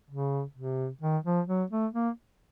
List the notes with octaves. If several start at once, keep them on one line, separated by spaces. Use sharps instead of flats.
C#3
C3
D#3
F3
F#3
A3
A#3